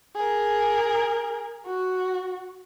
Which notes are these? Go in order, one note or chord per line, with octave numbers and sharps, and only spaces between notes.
G#4 A#4
F#4